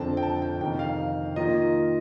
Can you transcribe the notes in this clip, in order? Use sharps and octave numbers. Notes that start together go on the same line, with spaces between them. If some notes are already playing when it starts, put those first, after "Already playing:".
Already playing: F2 D3 F3 C4 A5
G5
A5
G5
F2 C3 D#3 G5
F5
D#3 A#3 F4 D#5